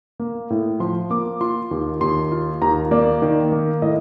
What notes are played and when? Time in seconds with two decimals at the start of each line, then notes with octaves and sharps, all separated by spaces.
0.20 A#3
0.50 A2
0.80 F3 C6
1.10 A#3 D6
1.41 F4 C6
1.71 D#2
2.01 D#2 C6
2.32 F4
2.62 D#2 A#5
2.91 A#3 D5
3.22 D#3
3.52 A#3
3.82 A2 D#5